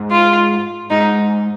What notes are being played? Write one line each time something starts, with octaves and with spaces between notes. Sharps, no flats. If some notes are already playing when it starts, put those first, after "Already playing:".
Already playing: G#2
F4
G#2 D#4